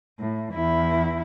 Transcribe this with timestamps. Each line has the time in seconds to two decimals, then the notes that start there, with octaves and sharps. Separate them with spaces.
0.19 A2
0.54 E2 E4